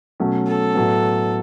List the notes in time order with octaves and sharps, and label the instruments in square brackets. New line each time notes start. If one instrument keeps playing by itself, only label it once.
[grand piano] B2 F#3 A3 C#4
[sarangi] A4
[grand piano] A2 F#3 B3